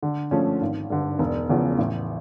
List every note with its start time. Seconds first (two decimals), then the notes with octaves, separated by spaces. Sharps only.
0.03 D3
0.31 F3 A3 C#4
0.61 G#1
0.90 G2 D3
1.19 E1
1.49 E2 C#3 F3
1.78 A1